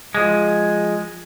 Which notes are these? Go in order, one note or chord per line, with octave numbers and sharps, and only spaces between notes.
F3 G#3